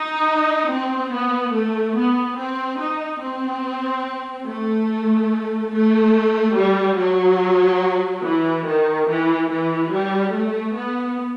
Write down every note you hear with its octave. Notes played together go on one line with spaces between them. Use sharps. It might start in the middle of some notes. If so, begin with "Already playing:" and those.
Already playing: D#4
C4
B3
A3
B3
C4
D#4
C4
A3
A3
G3
F#3
E3
D#3
E3
E3
G3
A3
B3